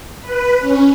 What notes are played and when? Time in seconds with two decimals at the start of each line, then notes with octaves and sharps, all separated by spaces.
0.22 B4
0.58 C#4